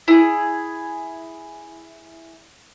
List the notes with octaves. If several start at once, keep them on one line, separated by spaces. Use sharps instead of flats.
E4 G#4